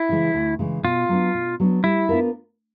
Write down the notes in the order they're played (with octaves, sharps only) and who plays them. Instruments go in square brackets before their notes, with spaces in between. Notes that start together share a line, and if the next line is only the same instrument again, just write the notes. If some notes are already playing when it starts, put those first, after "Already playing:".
Already playing: [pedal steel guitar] E4
[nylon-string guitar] C#3 E3 G#3
D2
C#3 E3 G#3
[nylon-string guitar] B2 [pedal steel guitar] F4
[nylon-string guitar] F#3 B3 D4
B2
F#3 B3 D4
[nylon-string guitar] G3 [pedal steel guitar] E4
[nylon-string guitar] B3 D4 F4 A#4